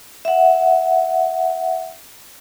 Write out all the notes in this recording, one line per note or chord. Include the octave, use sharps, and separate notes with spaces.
E5 F#5